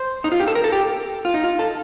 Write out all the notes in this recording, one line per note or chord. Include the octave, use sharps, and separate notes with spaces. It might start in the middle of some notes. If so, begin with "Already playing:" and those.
Already playing: C5
D#4
F4
G4
A4
A#4
A4
G4
F4
D#4
F4
A4